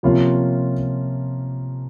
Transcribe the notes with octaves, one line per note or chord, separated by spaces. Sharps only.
C3 F3 A#3 C#4 F4